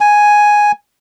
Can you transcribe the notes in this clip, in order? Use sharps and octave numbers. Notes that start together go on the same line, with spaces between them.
G#5